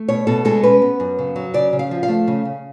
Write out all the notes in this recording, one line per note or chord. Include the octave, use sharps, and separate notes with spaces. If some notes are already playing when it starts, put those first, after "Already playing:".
Already playing: A3
B2 C#5
B2 A4
G#3 A4
C#4 B4
B3
F#2
C#3
F#3
C#3 D5
C#3
F5
F3
F5
A3
C#3
C#3